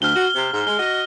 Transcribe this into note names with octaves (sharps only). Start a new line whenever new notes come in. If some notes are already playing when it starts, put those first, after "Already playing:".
D2 F6 G7
F#4
C3
G#2
G#3 G7
F#4 D#5